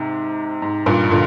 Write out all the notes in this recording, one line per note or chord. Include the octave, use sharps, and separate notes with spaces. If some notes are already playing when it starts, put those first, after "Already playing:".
Already playing: G#2 C3
G#2
G2 A#2
A#2 D3